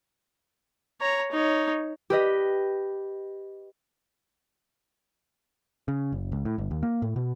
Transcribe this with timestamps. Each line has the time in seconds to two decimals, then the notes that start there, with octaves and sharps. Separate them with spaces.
1.01 C#5 A#5
1.31 D#4 C#5
2.10 G4 B4 D#5
5.88 C#3
6.12 F#1
6.32 C#2
6.45 A2
6.58 G1
6.71 D#2
6.83 A#3
7.02 A2
7.16 B2